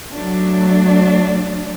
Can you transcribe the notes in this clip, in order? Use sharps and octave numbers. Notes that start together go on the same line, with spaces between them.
F#3 A3 D4